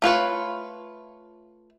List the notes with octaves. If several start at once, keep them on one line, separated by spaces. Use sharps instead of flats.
A3 F4 B4 C#5